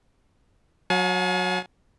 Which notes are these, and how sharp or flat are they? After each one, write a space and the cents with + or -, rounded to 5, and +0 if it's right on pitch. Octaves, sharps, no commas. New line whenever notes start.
F#3 -15 F5 +45 G#5 +35